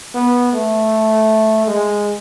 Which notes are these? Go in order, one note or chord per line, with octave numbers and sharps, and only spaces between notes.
B3
A3
G#3